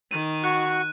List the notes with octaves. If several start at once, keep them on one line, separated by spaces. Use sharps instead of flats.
D#3 D#7
F#4 C#6 F#6